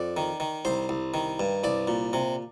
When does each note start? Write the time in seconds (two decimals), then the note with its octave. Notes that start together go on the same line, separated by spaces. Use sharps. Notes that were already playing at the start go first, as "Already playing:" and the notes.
Already playing: F2 D5
0.17 D#3
0.40 D#3
0.65 C2 C5
0.89 C2
1.14 D#3
1.40 G2
1.64 C2 D5
1.88 A#2
2.13 C3